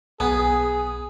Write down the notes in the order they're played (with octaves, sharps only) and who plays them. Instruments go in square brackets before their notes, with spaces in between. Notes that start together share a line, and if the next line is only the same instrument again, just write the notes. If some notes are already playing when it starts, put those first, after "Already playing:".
[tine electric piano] B1 [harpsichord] B3 [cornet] G#4 [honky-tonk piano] G#5 D#6